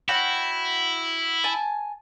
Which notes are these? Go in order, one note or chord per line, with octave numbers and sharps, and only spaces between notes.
E4 F#4 C#5 G5
G#5 A5